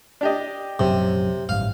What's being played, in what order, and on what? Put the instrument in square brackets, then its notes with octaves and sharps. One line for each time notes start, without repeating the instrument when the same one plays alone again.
[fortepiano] D4 G4 D#5
[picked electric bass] A#1 F#2 F#3 [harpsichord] C3
[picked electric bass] A1 G2 [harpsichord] F5